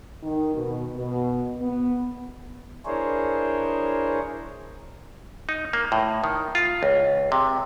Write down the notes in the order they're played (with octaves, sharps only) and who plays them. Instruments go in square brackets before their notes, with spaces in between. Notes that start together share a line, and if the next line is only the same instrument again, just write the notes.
[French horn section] D#3
B2
B2
B3
[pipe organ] D4 E4 G#4 A#4 C5 C#5
[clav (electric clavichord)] D#4
A#3
A2
D#3
F4
C#2
C3